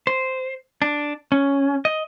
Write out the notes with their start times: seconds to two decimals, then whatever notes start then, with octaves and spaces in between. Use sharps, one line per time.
0.07 C5
0.82 D4
1.32 C#4
1.85 D#5